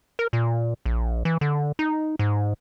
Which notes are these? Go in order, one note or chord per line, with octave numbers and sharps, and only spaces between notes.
A#4
A#2
A#1
E3
D3
D#4
G#2